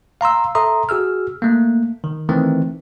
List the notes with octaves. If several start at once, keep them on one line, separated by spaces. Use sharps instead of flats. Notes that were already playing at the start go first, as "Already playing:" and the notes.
F5 A#5 C6 E6
A4 E5 A#5 C6 D#6
F#4 G#4 E6 F6
A3 A#3
D#3
D#3 E3 A3 C4